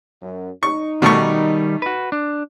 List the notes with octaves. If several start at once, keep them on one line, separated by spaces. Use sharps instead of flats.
F#2
D#4 C#6
B2 D#3 G3 A3 A#4 C#6
F#4 B4
D4